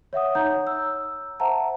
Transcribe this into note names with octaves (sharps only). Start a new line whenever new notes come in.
C#5 E5 F#5 D#6
D#4 C#5 F#5 A#5 G6
E6
C5 E5 F#5 A5 A#5